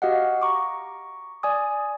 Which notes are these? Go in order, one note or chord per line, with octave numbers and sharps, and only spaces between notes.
F#4 G4 D#5 F5 F#5
A#5 C#6 D6
D5 G#5 D#6